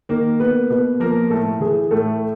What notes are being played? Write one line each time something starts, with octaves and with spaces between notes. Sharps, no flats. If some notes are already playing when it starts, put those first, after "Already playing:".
D#3 A#3 A#4
A#3 B3 B4
B2 B3 B4
F3 A#3 A#4
A2 A3 A4
E3 G#4
A2 A3 A4